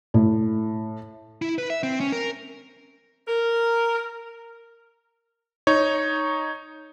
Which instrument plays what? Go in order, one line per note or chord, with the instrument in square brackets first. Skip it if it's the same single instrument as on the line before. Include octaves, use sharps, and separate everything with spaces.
[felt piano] A2
[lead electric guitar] E4
B4
E5
C4
C#4
A#4
[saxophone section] A#4
[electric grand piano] D#4 C#5